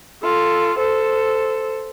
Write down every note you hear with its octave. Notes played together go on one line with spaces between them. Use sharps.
F4 A4
A4 C5